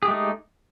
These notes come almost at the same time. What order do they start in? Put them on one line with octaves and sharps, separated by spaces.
G#4 G4 G#3 A3 D#4